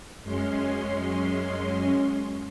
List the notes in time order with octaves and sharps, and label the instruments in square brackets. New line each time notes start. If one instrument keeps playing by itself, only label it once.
[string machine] F#2 G#3 C#4 C6